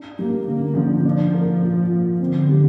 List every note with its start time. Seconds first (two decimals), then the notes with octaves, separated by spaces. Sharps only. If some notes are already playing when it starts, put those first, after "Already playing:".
Already playing: D4
0.19 G3 A#3
0.47 D3 A#3
0.76 D3 F3
1.05 F3 D4
1.34 A#3
1.62 A#2
1.92 A#2
2.20 D3 C4
2.49 G3